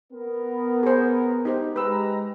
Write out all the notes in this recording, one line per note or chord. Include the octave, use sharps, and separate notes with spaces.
B3 A#4
G#4 C5
D#4 G4 C5
G#3 G4 B4 A#5 E6